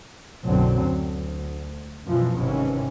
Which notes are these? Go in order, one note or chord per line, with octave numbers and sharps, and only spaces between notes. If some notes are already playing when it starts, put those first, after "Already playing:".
B1 F#2 A2 D3 F#3 C4
D2
F#2 B2 E3 F3
G#1 G#2 C3 E3 C#4